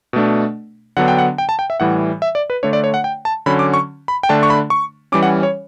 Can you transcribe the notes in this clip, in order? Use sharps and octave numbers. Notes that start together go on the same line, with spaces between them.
B2 A3 D4
D3 F#3 B3 D4 F#5
G5
F#5
G5
A5
G5
E5
A2 E3 G3 F#5
E5
D5
B4
D3 A3 D4 C#5
D5
C#5
F#5
G5
A5
D3 F#3 C#4 B5
D6
C#6
B5
G5
D3 A3 D4 A5
C#6
B5
C#6
E3 G3 C#4 D6
F#5
C#5